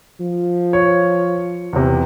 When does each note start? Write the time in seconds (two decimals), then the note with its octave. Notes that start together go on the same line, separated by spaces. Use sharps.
0.20 F3
0.73 C#5
1.73 E2 C3